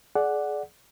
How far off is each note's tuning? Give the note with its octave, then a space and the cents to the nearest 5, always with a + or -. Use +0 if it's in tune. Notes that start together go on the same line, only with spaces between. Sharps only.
G#4 +30 D5 +0 F#5 +0